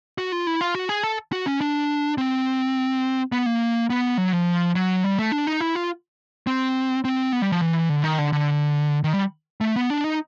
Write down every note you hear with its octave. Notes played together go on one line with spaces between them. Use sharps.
F#4
F4
E4
F4
F#4
G#4
A4
F#4
C#4
D4
C4
B3
A#3
B3
F#3
F3
F#3
G3
A3
D4
D#4
E4
F4
C4
C4
B3
G3
F3
E3
D3
D#3
D3
D3
D#3
G3
A3
B3
D4
D#4